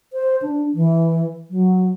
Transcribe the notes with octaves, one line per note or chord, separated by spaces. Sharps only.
C5
D4
E3
F#3